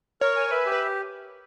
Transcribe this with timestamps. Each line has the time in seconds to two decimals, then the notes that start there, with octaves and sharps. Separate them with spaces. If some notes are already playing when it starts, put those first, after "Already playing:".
0.21 A#4 C#5
0.36 G#5
0.51 B4 E5
0.66 G4
0.72 B4